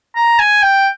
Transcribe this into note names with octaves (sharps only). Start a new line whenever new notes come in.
A#5
G#5
G5